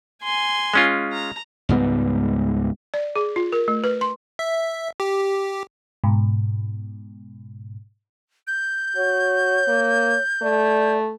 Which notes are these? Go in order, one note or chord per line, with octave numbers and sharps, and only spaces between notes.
G#5 C6
G#3 C#4 F4
A#5
C#2 G#2 G3 B3
D5
G#4
F4
A#4
A3
B4
C6
E5
G4
G#2 B2
G6
F#4 C#5
A#3
A3 D5